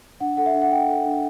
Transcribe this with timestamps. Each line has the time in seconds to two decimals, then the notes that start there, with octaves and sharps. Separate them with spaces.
0.20 D4 F#5
0.37 A4 F#5
0.46 E5
0.54 D4
0.62 F#5
0.71 D4 G5
0.88 A4
1.06 D4